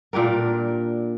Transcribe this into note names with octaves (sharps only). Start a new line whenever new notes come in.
A#2 D4 G4 A#4